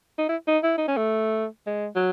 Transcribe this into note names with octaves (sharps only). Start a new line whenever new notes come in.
D#4
E4
D#4
E4
D#4
C#4
A3
G#3
F#3